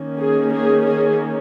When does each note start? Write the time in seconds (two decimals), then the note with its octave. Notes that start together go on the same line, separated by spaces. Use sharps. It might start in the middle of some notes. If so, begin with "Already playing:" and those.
Already playing: D#3 A#3 C#4
0.20 G#4
0.53 G#4
0.85 G#4